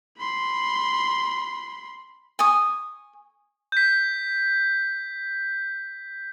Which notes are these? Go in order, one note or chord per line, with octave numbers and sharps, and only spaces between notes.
B5 C6
G#5 C#6 D#6
G6 B6